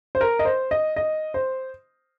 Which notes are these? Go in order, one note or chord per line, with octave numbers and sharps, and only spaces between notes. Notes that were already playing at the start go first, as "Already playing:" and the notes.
C5
A#4
D#5
C5
D#5
D#5
C5